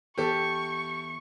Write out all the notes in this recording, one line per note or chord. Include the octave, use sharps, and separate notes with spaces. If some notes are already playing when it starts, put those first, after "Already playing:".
E2 G4 A4 C#6